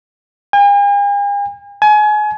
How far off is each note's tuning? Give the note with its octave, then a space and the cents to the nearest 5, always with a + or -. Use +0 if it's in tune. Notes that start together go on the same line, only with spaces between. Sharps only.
G#5 -45
G#5 +30